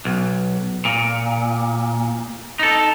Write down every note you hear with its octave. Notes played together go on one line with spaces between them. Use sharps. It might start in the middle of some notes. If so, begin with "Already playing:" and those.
B1
A#2
D#4 A4